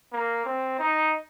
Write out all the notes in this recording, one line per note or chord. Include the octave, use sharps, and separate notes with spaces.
A#3
C4
D#4